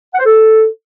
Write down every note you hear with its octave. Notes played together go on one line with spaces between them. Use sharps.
F#5
C5
A4